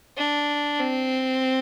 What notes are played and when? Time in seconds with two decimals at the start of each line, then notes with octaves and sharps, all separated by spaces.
0.17 D4
0.79 C4